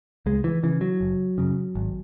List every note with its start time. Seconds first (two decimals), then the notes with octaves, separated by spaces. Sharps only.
0.26 C#2 G#3
0.44 E3
0.63 C#3 E3
0.81 F#3
1.01 F#1
1.38 F#2 C#3
1.75 G#1